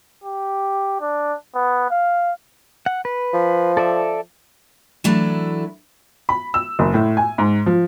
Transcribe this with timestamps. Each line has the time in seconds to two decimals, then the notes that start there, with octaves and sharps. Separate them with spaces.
0.24 G4
1.01 D4
1.55 B3
1.90 F5
2.86 F#5
3.05 B4
3.33 F3
3.77 A4 D5 E5
5.04 E3 F#3 A3 D4 E4
6.29 B5
6.54 E6
6.79 F#1
6.94 A2
7.17 G#5
7.38 G#2
7.66 F3